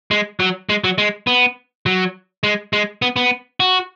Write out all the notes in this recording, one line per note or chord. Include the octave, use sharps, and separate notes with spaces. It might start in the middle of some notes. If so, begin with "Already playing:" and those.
G#3
F#3
G#3
F#3
G#3
B3
F#3
G#3
G#3
B3
B3
F#4